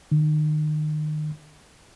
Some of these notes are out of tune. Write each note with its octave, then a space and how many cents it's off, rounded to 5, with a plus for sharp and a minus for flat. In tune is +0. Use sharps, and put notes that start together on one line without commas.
D#3 -30